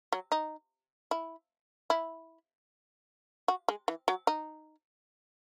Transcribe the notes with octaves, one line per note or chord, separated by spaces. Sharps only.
F#3
D#4
E4
E4
F#4
G#3
E3
F#3
D#4